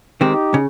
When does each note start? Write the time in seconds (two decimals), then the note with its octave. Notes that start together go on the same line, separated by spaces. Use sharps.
0.21 D#3 G#3 C4 D#4 G4
0.54 C#3